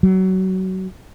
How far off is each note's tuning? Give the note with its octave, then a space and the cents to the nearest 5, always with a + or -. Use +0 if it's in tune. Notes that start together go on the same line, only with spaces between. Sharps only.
F#3 +25